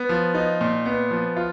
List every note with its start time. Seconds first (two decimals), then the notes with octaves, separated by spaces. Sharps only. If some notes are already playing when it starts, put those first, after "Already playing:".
Already playing: B3
0.09 F3
0.34 D#4
0.61 A#2
0.86 B3
1.11 F3
1.36 F4